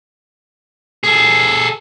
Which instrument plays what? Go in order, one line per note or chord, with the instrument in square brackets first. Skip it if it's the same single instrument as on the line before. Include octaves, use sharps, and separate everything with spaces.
[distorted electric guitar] G#4 A4